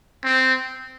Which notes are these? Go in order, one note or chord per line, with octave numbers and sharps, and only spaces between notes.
C4